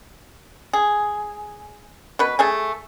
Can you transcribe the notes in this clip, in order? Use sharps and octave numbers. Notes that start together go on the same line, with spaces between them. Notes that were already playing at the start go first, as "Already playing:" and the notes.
G#4
B2 B4
A3 G#4 G#5